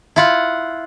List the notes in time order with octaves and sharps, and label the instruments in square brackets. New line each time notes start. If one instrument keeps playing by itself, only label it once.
[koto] E4 F4 F#5